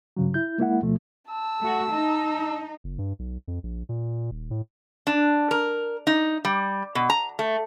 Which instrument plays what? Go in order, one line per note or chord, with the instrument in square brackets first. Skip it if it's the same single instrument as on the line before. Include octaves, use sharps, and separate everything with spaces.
[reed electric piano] G2 C#3 F#3
E4 G6
G#3 A#3 E4 F#5
D2 B2 F3 A3
[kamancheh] A5 E6
[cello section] A3 F#4
D#4
[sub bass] F#1
G2
B1
F2
A#1
A#2
D#1
A2
[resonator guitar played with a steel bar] D4
A#4
D#4
G3
B2
A#5
A3